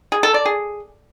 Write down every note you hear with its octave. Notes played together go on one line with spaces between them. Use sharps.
G#4
A4
D5
G#4